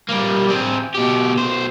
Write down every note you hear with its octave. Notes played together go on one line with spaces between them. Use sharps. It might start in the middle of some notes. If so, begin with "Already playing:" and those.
G3 A#3
C4 G#4
B2 G4
B1 C5